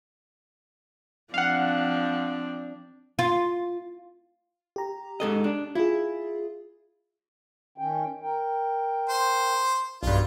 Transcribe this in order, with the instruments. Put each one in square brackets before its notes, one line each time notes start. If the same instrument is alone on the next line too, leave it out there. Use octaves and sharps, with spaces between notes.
[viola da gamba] F3 C4 D4 [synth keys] F5 F#5
[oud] F4
[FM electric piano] G4 A#5
[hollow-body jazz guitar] G#2 A4 D#5
D4
[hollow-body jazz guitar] E4 [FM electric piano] F4 G#4
[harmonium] D#3 C#4 G5
A#4 G5
[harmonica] C5
[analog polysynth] B1 G2 [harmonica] F4